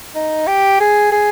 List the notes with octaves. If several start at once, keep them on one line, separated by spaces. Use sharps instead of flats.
D#4
G4
G#4
G#4